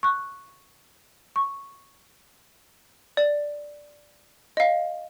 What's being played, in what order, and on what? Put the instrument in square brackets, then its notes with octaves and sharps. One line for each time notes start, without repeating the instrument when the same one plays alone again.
[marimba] C#6 F#6
C#6
[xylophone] D5
D#5 F5